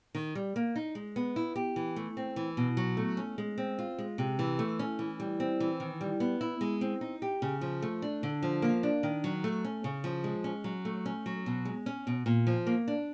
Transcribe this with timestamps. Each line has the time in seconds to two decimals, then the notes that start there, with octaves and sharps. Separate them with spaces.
0.15 D#3
0.35 G3
0.56 A#3
0.76 D#4
0.95 G#3
1.16 B3
1.36 E4
1.56 G4
1.76 E3
1.96 A3
2.17 C4
2.36 E3
2.57 B2
2.77 F#3
2.97 A3
3.17 C#4
3.38 G#3
3.58 C4
3.79 F4
3.99 G#3
4.18 C3
4.39 E3
4.59 A3
4.79 C#4
4.99 E3
5.20 G3
5.40 C4
5.60 E3
5.80 D#3
6.01 G3
6.20 B3
6.41 E4
6.61 G#3
6.81 C4
7.01 D#4
7.22 G4
7.42 C#3
7.61 F3
7.82 A3
8.02 D4
8.23 D3
8.43 F3
8.62 A#3
8.83 D4
9.03 D#3
9.24 F#3
9.44 A3
9.65 C#4
9.84 C#3
10.04 F3
10.24 G#3
10.44 C#4
10.64 F#3
10.85 A3
11.06 C#4
11.26 F#3
11.46 B2
11.65 G#3
11.86 C#4
12.07 B2
12.26 A#2
12.47 F3
12.67 A#3
12.88 D4